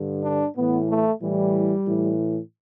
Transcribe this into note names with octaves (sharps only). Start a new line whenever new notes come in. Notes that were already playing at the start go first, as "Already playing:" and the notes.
Already playing: G2 D3
D4
A2 E3 B3
A3
A2 E3 G3
A2 E3